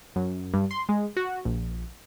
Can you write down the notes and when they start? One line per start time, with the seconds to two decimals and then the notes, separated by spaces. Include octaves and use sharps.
0.16 F#2
0.54 G2
0.71 C6
0.89 G#3
1.17 F#4
1.45 A#1